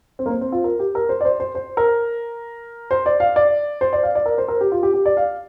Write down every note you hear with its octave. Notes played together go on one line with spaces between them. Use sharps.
C4
A#3
C4
C4
F4
A#4
G4
A#4
C5
D5
C5
C5
C5
A#4
C5
D5
F5
D5
C5
D5
F5
D5
A#4
C5
A#4
G4
F4
G4
G4
D5
F5